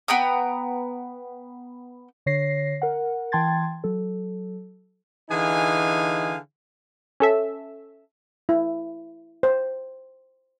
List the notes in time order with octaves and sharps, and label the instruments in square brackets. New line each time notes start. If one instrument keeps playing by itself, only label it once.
[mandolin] B3 G5 A#5 D#6
[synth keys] D3 C#5 A#6 C7
A#4 F#5
E3 G5 A5 C6 G#6 A6
F#3 A4
[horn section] D3 E3 D#4 G#4 F5 G#5
[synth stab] C#4 A4 E5
[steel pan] E4
C5